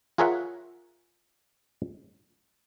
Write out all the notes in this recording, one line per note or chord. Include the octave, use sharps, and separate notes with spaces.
F4 G#4 A#4 C#5 E5 F#5